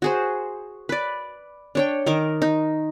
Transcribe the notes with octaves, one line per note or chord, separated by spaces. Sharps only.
F#4 G#4 C5
B4 D5
D4 C#5 G5
D#3 A#4 D6
D#4